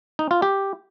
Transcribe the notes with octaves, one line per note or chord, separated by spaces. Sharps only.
D#4
F4
G4